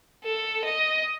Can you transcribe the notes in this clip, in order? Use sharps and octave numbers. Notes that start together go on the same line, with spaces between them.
A4
D#5